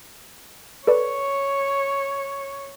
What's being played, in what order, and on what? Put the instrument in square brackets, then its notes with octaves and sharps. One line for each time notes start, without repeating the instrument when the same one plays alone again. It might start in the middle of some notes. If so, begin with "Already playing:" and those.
[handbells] A4 B4 D5 [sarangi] C#5